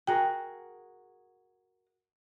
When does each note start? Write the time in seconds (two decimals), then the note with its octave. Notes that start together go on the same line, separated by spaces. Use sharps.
0.07 F#4 G#4 A#4 G5